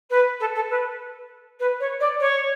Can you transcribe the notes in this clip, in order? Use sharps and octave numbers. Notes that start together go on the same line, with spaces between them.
B4
A4
A4
B4
B4
C#5
D5
C#5